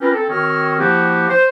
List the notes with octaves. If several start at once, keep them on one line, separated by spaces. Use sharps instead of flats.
C4 C#4 F4 G4 A#4 B4
C4 A4
D#3 C4 F#4 C#5 D#5 F6
F3 A#3 E4 F#4 G4
C5